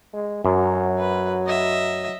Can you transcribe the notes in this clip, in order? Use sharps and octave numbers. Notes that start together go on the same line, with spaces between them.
G#3
F#2 F#3
B4
D#5 E5